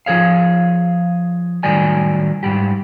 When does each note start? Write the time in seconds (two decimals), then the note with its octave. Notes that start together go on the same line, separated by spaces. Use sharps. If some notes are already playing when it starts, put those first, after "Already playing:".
0.06 F3 G#4 C#5 F5
1.63 A2 D#3 F#3 G3 D5 G#5
2.43 G#2 G3 G4